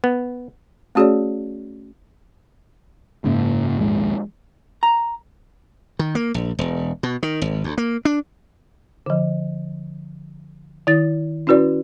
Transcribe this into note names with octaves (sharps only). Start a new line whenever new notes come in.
B3
A3 C#4 F#4 G#4 C#5 D5
F#1 G#2 C#3 A#3
A#1 D#2 G#3
A#5
D#3
A#3
A#1
E1
B2
D#3
G#1
D2
A#3
D4
D3 F3
D#3 E4 A6
C#4 E4 F#4 B4 D5